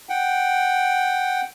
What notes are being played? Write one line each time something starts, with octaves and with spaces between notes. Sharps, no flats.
F#5 G5